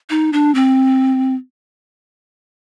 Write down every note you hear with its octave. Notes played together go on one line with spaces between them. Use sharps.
D#4
D4
C4